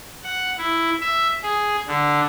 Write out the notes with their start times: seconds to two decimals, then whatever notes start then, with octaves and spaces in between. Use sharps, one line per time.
0.23 F#5
0.57 E4
1.01 E5
1.43 G#4
1.88 D3